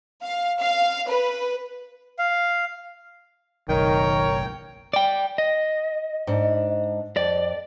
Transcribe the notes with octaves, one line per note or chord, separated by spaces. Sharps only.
F5
F5
B4
F5
F#1 B1 D#3 A#4 C#5 G5
D5 G5
D#5
G#2 D4
F2 D5